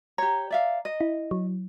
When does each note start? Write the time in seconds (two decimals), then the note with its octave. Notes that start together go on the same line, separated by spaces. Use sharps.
0.18 G4 C#5 A#5
0.50 D5 E5 F5
0.85 D#5
1.01 E4
1.31 F#3